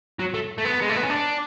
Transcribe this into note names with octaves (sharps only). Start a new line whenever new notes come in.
F#3
A3
A3
B3
G#3
A3
B3
C#4
D4